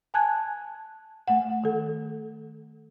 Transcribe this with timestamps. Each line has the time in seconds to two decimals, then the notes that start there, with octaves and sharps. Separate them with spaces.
0.14 G#5 A5 F#6 G#6
1.28 A3 F#5
1.64 D#3 A4